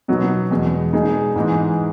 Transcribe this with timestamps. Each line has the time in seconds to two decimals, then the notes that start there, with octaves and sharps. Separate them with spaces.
0.08 B2 F#3 B3 D#4
0.51 E2 B2 G#3
0.93 B2 G#3 D#4 G#4
1.35 G#2 E3 G#3 D#4